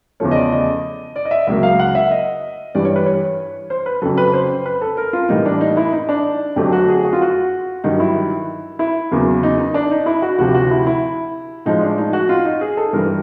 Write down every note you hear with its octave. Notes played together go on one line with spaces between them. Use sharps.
E2 C#3 F3 A3 C#5
D#5
D5
D#5
D5
D#5
E5
C#2 C#3 F#3 A#3 E5
F5
F#5
E5
D#5
G2 E3 G3 D5
C#5
B4
C#5
C5
B4
F2 C#3 F#3 A4
B4
C5
B4
A4
A#4
F4
A2 E3 G3 A#3 D#4
D4
D#4
E4
D#4
D4
F2 D3 F#3 A3 G4
F#4
G#4
F#4
F4
F#4
G2 D#3 F#3 D#4
E4
E4
E2 C#3 F#3 A#3
D#4
D#4
D4
D#4
E4
F#4
D2 C3 F3 F#4
G4
F#4
E4
E4
A2 F3 G#3 D#4
D4
D#4
F#4
F4
D#4
G#4
A4
G2 E3 G3 A#4